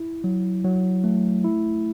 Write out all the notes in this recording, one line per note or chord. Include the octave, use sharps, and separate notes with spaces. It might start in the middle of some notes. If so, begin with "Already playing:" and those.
Already playing: E4
F#3
F#3
A3
E4